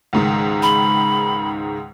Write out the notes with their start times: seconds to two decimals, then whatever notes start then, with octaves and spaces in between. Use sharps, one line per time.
0.13 C#2 G#2 D#3
0.62 B5